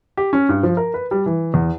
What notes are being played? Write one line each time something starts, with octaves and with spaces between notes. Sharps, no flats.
G4
C#4
G2
F3
A#4
B4
G3
E3
E2